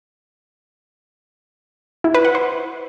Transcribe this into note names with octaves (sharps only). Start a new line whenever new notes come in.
E4
B4
F#5
C5